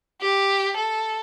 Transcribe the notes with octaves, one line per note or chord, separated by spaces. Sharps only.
G4
A4